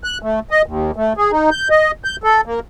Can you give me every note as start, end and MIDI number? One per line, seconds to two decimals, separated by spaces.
0.04 0.18 90
0.22 0.40 57
0.51 0.62 75
0.66 0.91 39
0.96 1.13 57
1.17 1.31 68
1.31 1.50 63
1.51 1.68 91
1.70 1.91 75
2.04 2.16 91
2.23 2.41 69
2.45 2.60 58